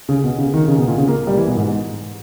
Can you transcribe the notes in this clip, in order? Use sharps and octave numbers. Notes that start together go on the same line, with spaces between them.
C#3
B2
C#3
D#3
C#3
B2
A#2
C#3
A#3
G3
E3
B2
G#2